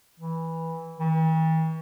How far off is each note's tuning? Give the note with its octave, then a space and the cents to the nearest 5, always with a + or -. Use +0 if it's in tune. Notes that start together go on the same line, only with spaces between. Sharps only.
E3 -10
E3 -45